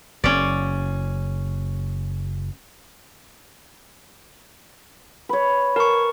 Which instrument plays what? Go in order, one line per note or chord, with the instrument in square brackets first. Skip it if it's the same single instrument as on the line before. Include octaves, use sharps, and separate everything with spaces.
[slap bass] F#1 [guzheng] C#4 D5
[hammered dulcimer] B4 C#5
[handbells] A#4 C#6 [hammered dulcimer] A5